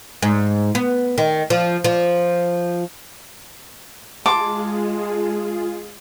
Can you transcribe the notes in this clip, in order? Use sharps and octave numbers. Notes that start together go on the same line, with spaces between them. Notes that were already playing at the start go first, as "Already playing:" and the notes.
G#2
B3
D#3
F3
F3
G#3 F4 G#4 A5 C6 D6